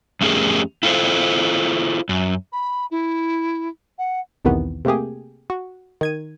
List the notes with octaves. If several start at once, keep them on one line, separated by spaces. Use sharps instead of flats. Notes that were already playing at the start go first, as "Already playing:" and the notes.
F2 A3 C#4 G4 G#4 A#4
E4 F4 A4 B4 C5
F#2
B5
E4
F#5
B1 E2 C3 D#3 E3 B3
C3 A3 A#3 G4 G#4
F#4
D#3 G#6 D#7